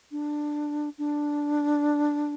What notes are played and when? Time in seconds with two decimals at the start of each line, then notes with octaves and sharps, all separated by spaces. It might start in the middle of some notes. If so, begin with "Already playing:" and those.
0.12 D4
0.98 D4